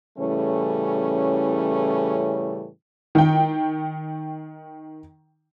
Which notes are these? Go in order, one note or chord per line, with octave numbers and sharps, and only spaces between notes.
A2 C#3 E3 G3 A3 C#4
D#3 G5